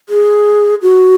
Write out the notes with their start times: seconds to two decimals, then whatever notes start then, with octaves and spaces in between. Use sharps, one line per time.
0.09 G#4
0.82 F#4